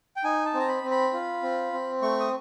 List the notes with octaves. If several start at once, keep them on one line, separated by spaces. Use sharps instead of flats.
G5
D#4 G#5
A5
C4
A#5
B5
C4
B5
F4
C4
C4
A3 C#6
D#6